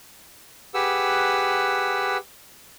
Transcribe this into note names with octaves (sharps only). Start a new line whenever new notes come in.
G4 G#4 B4 F#5 E6